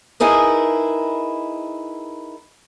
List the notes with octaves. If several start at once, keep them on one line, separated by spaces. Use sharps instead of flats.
D#4 E4 G#4 A#4 B4